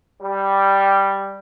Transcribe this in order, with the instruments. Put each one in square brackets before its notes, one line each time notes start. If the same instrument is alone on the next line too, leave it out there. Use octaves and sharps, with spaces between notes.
[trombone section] G3